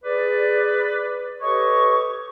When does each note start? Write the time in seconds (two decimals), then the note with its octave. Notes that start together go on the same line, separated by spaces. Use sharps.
0.04 G#4 B4 D5
1.41 G4 A4 B4 C#5 D#5 C#6